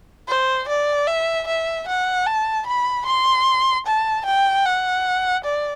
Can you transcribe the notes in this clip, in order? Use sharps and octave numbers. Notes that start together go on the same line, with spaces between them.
C5
D5
E5
E5
F#5
A5
B5
C6
A5
G5
F#5
D5